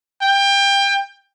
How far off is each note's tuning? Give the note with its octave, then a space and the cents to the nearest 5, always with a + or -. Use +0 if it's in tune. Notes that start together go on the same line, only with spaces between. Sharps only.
G5 +25